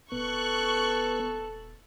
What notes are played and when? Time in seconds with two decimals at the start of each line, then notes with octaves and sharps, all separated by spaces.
0.12 D#1 B3 A4 C#6 F#6